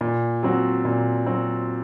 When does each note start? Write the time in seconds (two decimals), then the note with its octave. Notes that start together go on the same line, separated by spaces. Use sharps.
0.01 A#2
0.43 F#3 C4 F#4
0.85 A#2
1.26 F#3 C4 F#4